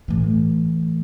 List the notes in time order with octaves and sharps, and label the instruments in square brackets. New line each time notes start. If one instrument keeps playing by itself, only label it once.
[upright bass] A2 E3